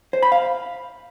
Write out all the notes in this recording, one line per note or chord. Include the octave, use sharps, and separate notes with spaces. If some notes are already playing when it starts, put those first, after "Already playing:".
C5
B5
F5